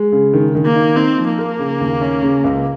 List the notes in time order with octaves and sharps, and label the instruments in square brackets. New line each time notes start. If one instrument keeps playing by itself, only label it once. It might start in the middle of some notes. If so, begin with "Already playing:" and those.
Already playing: [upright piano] G#3
C#3
D#3
D#3
[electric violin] A#3
[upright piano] D#4
[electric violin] C4 [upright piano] D#4
[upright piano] F3
[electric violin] A#3
[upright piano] A#4
C#3
D#2
C#4
C#3
C#2